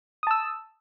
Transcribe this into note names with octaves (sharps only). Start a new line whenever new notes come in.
A5 D#6 E6